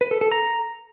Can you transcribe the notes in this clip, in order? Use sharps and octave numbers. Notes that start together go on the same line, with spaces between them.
B4
A4
A4
A#5